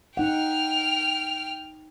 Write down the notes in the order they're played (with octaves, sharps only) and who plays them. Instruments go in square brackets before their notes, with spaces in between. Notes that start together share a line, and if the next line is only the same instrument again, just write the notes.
[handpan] D#4 F#5 [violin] G5 F6